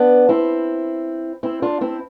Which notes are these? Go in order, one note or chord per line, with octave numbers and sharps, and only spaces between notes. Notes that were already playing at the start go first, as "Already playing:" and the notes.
Already playing: B3 D4
C4 E4
C4 E4
D4 F4
C4 E4